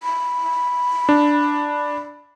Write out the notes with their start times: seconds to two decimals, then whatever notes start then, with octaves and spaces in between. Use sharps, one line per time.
0.03 B5
1.09 D4